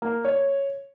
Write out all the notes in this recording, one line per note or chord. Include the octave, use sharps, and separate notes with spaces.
A#3
C#5